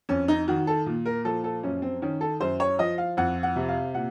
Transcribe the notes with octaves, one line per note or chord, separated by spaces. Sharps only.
F2 C#4
D#4
D#3 F#4
A4
A#2
A#4
F3 A4
A4
F#2 C#4
C4
D#3 C#4
A4
F#2 C5
C#5
F3 D#5
F5
F2 F#5
F#5
C3
F5
A#2 F#5